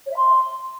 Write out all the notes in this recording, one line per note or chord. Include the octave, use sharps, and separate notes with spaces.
C#5
E5
C6